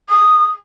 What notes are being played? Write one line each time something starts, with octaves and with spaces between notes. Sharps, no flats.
D#6